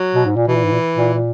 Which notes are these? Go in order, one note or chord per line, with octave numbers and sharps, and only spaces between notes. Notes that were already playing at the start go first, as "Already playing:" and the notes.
Already playing: F#3
B2
G#2
A#2
B2 E3
A#2
G#2
A#2
A#2
A#2